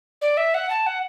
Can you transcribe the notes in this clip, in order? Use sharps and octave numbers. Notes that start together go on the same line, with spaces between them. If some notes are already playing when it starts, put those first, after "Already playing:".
D5
E5
F#5
A5
F#5